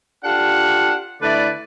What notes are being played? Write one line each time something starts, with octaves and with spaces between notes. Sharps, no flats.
D4 F4 G4 A4 F5 F#5
D3 A3 E4 B4 D5